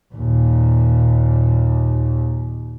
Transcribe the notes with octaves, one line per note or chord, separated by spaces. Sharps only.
D#2 A#2